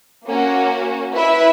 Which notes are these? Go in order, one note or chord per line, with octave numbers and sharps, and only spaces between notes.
A#3 C#4 F#4
E4 B4 E5